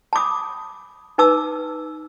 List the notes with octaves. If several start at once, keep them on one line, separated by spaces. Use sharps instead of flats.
A5 B5 D6 D#6
D#4 B4 A5 D6 E6